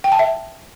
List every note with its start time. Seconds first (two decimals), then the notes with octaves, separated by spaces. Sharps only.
0.04 G5
0.12 A5
0.19 E5